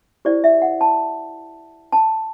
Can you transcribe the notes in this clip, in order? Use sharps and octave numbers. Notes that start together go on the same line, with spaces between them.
E4 G4 C5 D5
E5
F#5
A5
A5